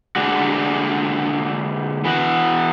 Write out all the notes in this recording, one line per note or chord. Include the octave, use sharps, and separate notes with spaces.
D3 G#3 D4 F#4
E3 B3 F#4